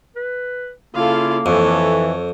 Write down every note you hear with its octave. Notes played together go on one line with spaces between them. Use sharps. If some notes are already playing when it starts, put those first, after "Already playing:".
B4
C#3 A#3 E4 F4 A4 F5
F2 E3 A4 C#5